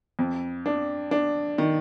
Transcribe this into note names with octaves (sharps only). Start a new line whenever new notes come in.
F2
D4
D4
D#3